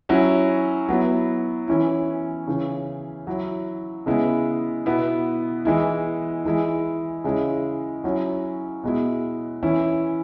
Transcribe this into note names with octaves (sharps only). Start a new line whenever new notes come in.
F#3 C#4 E4
F#3 B3 E4
E3 C#4 E4
C#3 E3 C#4
F#3 E4
C#3 G#3 B3 E4
B2 B3 E4
E3 G#3 E4
E3 G#3 E4
C#3 G#3 C#4 E4
F#3 C#4 E4
B2 G#3 E4
E3 C#4 E4